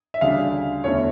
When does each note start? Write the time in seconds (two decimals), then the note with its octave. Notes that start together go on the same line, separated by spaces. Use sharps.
0.14 E5
0.21 D2 C#3 G3 D4 F5
0.84 E2 D3 A3 C#4 E4 C#5